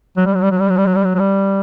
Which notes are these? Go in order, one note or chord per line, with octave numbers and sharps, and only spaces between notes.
F#3
G3
F#3
G3
F#3
G3
F#3
G3
F#3
G3
F#3
F#3
G3